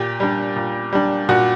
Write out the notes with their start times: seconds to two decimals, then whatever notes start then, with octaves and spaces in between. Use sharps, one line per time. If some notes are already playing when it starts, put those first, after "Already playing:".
Already playing: A#2 G4
0.20 G3 D4
0.56 A#2
0.93 G3 D4
1.29 A#2 F#4